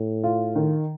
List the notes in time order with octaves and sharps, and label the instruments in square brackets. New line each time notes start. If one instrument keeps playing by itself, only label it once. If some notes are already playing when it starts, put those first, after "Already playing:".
Already playing: [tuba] A2
[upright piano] F4
D#3